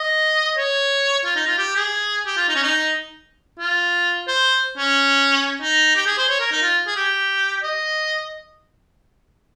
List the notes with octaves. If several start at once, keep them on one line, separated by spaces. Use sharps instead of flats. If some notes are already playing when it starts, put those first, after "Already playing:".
Already playing: D#5
C#5
F4
D#4
F4
G4
G#4
G4
F4
D#4
C#4
D#4
F4
C5
C#4
D#4
G4
G#4
C5
C#5
A#4
D#4
F4
G#4
G4
D#5